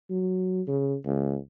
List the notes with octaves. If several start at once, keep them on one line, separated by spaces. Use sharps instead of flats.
F#3
C#3
C#2